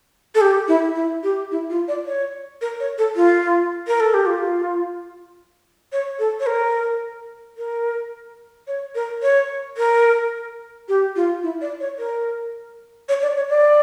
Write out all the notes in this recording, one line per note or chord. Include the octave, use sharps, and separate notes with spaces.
A4
G4
E4
E4
G4
E4
F4
D5
C#5
A#4
C#5
A4
F4
A#4
A4
G4
F4
C#5
A4
C#5
A#4
A#4
C#5
A#4
C#5
A#4
G4
F4
E4
D5
C#5
A#4
C#5
D5
C#5
D5